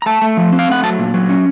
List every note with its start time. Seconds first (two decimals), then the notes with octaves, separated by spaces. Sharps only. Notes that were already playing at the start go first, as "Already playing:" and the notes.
0.02 A#5
0.06 A3 A5
0.21 A3
0.37 F3
0.52 C4
0.59 F5
0.68 A3 F#5
0.83 F#3 A5
0.99 A#2
1.14 F#3
1.29 C#4